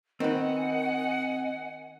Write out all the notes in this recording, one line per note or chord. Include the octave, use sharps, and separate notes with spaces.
D#3 C4 B4 D#5 F#5 G#5